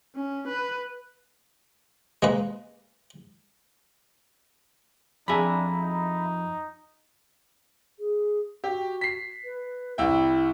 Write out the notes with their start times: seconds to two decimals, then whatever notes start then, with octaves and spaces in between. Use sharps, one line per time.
0.15 C#4
0.48 B4
2.22 G#3 A#3 B4
5.28 F2 D4 G#4 E5 A#5 B5
5.81 D#4
7.99 G#4
8.64 F#4 G4
9.01 B6 C7
9.44 B4
9.98 C2 E4 E5 G5